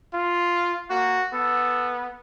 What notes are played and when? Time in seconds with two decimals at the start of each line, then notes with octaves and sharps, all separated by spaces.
0.14 F4
0.90 A#3 F#4
1.33 B3 A4